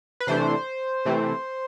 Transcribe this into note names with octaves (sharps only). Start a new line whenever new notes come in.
B4
C3 E3 A3 D4 C5
C3 E3 A3 C4